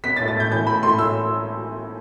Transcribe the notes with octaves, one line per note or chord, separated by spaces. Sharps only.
B3 B6
A6
A2
A6
A2 G6
E3 G6
A2 B5
A2 C6
A2 E6